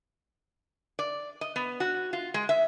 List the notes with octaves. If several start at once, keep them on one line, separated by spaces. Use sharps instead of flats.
D5
D#5
B3
F#4
F4
G#3
E5